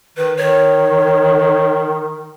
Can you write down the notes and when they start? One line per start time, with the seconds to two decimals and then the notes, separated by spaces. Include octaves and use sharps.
0.17 D#3 B4
0.37 D#3 C#5